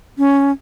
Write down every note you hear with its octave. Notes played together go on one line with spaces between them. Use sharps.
C#4